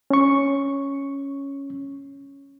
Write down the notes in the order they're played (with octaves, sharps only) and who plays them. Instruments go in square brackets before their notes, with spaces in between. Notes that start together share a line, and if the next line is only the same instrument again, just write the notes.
[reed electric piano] C#4 C#6